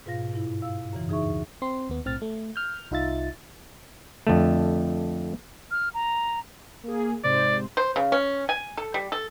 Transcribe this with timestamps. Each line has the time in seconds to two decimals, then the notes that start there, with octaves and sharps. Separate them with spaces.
0.06 G#2 B2 F4 F5 A#6
0.34 G2 E4
0.62 F5 E6
0.93 F#2 C#3 E3
1.09 D#4 G#4 E5 C#6
1.22 D2
1.62 C4 C6
1.89 D#2 B3
2.05 B1 A2 C4 F6 A6
2.22 A3
2.56 F6 G6
2.91 C2 D#4 F4 E5 A6
4.27 F2 D3 A3
5.71 F6
5.94 A#5
6.84 A#3 G#4
7.24 G#2 C3 C5 D5
7.77 C5
7.96 C#3
8.12 C#4
8.49 G#5
8.77 A4
8.94 G3
9.12 A4